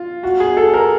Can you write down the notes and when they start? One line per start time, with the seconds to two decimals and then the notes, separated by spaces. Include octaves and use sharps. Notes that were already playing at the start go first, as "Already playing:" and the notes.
Already playing: F4
0.23 F#4
0.40 G#4
0.57 A4
0.74 A#4